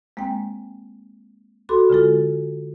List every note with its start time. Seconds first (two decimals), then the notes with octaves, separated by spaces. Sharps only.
0.17 G#3 A#3 C4 G5
1.69 F#4 A4 B5 C6 D6
1.90 D3 G#3 F4 A4